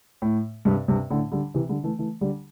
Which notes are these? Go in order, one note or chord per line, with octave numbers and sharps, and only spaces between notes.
A2
G2 C3
G2 C3
A2 D3
D3 G3
C3 E3
D3 G3
E3 A3
E3 A3
D3 G3